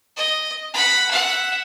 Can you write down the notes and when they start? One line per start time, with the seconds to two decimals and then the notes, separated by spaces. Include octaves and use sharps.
0.17 D#5
0.74 F#5 B5
1.11 E5 F#5